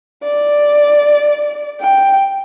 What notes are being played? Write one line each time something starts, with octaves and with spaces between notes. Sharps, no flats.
D5
G5